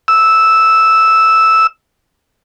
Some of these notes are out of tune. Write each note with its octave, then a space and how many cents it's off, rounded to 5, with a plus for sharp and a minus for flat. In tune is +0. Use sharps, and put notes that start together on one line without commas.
E6 -5